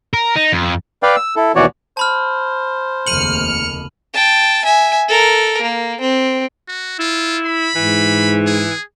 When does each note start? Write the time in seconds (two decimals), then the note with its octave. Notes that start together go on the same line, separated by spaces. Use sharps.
0.14 A#4
0.36 D#4
0.53 F2
1.03 B4 D5 F5 G5
1.16 E6
1.36 E4 A4
1.56 D#2 B2 E3 F#4 C#5 D5
1.97 C5 A5 B5 F6
3.07 F1 D#2 C#3 F6 C#7 D#7 F#7
4.13 G5 A5
4.64 E5 G#5
5.08 A4 A#4
5.61 A#3
6.01 C4
6.68 F#4
6.99 E4 F4
7.45 B5
7.75 G#2 E3
8.46 G#4